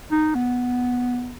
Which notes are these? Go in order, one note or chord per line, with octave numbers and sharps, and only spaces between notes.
D#4
B3